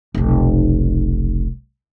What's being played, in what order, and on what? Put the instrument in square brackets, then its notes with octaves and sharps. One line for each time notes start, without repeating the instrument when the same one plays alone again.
[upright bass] F1 B1